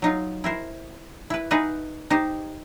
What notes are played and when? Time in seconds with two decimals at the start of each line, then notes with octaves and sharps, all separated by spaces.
0.02 F#3 D#4 F4
0.44 E4 A#4 C5
1.30 E4 B4
1.51 D#4 F#4 G#4 B4 E5
2.10 D#4 G4 C5